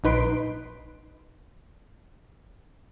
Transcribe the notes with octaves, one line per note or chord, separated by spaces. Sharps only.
A#1 D#4 B4 C6 D7